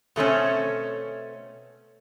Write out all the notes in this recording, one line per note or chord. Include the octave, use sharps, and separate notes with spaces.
B2 A3 C4 C#4